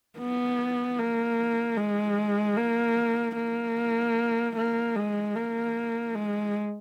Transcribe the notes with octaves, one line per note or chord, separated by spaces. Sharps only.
B3
A#3
G#3
A#3
A#3
A#3
G#3
A#3
G#3